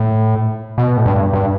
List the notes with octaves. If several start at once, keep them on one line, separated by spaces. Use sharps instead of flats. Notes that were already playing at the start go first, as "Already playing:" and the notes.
Already playing: A2
B2
A2
G2
G2